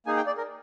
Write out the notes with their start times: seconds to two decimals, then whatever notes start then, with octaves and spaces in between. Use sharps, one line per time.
0.06 A#3 D#4 G#4 G#5
0.17 G5
0.27 D5
0.37 A#4